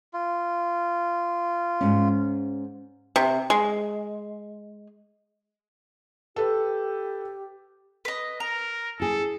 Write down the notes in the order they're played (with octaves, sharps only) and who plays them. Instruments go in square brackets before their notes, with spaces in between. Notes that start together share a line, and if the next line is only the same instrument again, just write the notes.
[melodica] F4
[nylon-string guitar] G#2 C#4
[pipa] C3
G#3
[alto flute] G4 [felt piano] A4 B4
[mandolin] B4 D#5
[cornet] A#4 [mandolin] A#5
[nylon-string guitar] E4 G#4 [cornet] A4